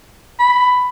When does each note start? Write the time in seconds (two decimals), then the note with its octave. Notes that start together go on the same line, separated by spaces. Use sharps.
0.39 B5